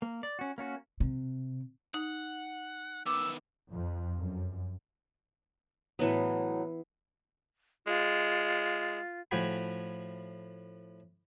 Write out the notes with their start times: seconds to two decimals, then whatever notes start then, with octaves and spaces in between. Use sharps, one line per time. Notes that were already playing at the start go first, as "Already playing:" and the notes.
0.02 A#3
0.23 D5
0.39 C#4 F#4
0.58 A#3 C#4 F#4
1.00 C3
1.94 D#4 F#5
3.06 D#3 B3 D6 E6
3.70 F2
4.19 F#2
5.99 A2 E3 F#3 B3
7.87 G#3 F4
9.31 A2 F3 F#4 G5 G#5 B5